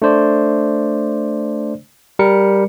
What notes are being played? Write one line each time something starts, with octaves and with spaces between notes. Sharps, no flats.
A3 D4 C5 D5
G3 A#4 C#7